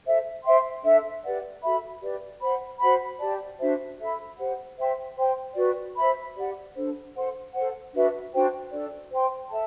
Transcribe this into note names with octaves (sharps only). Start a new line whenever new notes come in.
A4 C5 E5
C5 E5 G5 C6
D4 A4 E5
G4 B4 D5 F#5
F#4 A4 E5 B5
G4 B4 D5
C5 F#5 B5
F#4 C5 F#5 B5
G4 D5 A5
D4 F#4 C5 E5
A4 E5 B5
G4 C5 F#5
C5 E5 G5 C6
C5 G5 C6
F#4 B4 D5
C5 E5 B5
G4 D5 F#5
D4 A4 C5
A4 C5 F#5 C6
A4 C5 F#5
D4 F#4 B4 E5
D4 F#4 C5 G5
D4 A4 D5
C5 G5 C6
A4 E5 A5